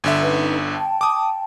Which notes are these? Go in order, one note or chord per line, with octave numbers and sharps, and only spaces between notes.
G1 D3 E5
C#4 D#4 B4
G5 A5
D6 D#6